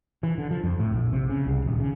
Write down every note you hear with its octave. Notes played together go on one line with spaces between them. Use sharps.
E3
D3
F3
F2
A2
A#1
C3
C#3
C2
D#1
C#3